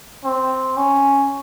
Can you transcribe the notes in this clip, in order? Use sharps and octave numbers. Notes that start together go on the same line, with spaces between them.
C4
C#4